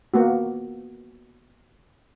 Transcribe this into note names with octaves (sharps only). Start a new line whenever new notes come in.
A#3 B3 F#4